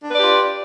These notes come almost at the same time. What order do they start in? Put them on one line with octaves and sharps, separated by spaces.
D4 B4 D5 G4 F4